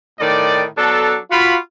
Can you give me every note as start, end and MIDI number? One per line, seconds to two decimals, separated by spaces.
0.20 0.65 45
0.20 0.65 51
0.20 0.65 74
0.77 1.16 54
0.77 1.16 59
0.77 1.16 62
0.77 1.16 69
1.31 1.57 65
1.31 1.57 66
1.31 1.57 83